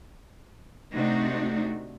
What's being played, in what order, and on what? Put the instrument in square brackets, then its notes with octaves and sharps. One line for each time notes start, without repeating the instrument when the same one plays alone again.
[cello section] C3 A3 C4 D4 D#4 F#4